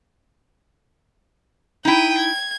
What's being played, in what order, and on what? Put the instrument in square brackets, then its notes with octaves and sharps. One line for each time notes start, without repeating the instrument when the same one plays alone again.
[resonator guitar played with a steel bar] D#4 E4 [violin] G5 D#7
[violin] G#6